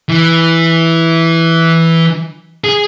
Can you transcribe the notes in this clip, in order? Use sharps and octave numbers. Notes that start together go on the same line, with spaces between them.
E3
G#4